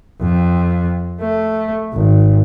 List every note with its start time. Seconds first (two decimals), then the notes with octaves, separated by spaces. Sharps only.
0.22 F2
1.21 A3
1.94 G#1